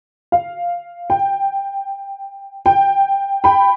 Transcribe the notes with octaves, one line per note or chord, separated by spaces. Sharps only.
F5
G5
G5
G5 B5